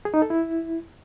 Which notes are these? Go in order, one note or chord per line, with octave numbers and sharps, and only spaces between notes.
G#4
D#4
A4
E4